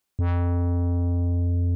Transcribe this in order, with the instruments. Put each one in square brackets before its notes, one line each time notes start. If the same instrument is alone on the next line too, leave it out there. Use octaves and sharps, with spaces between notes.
[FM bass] F2